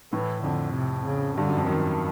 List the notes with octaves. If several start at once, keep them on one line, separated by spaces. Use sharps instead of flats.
A2 E3
F2 D3
C3
C#3
G2 D3
F#2
F2
F#2 D#3